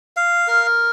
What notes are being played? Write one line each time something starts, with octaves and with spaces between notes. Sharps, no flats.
F5
A#4